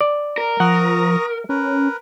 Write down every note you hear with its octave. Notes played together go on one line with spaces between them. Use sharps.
D5
A#4
F3 F#5 A#5 C#6 D#6
C#4 A#4 B4